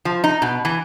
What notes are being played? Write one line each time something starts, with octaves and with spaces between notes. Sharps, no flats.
F3
D#4
B2
E3